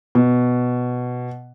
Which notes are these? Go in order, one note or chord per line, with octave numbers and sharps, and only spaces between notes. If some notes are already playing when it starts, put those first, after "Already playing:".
B2